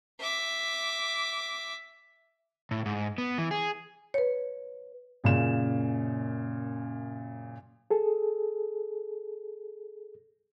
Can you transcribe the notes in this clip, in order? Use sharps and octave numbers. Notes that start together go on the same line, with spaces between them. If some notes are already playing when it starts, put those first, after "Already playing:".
E5 D6
A2
G#2
B3
E3
G#4
B4 C#5
F#2 A#2 C#3 E7
G#4 A4